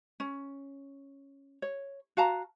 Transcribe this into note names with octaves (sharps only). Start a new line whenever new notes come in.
C#4
C#5
F#4 F5 A5 A#5